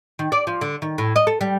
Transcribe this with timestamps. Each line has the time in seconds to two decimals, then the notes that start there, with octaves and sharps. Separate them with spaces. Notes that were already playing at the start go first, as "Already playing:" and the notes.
0.19 D#3
0.32 D5
0.47 F3
0.61 D3
0.82 D#3
0.98 A2
1.16 D#5
1.27 A4
1.41 G3